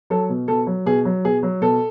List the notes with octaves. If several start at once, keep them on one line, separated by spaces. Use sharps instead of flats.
F#3 A4
B2
B2 A4
F#3
B2 G#4
F#3
B2 G#4
F#3
B2 A4